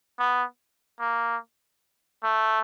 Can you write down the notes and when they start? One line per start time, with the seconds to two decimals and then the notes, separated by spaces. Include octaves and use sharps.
0.19 B3
1.00 A#3
2.24 A3